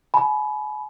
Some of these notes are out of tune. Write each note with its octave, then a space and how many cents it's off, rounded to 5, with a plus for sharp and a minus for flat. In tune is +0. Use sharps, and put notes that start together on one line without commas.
G#5 +40 B5 +0